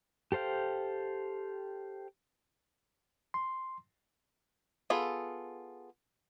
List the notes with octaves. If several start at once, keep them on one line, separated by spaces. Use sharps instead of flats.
G4 A4 C5 F5 G5
C6
B3 F4 G#4 A4